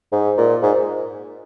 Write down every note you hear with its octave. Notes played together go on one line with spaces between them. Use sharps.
G#2
A#2
G#2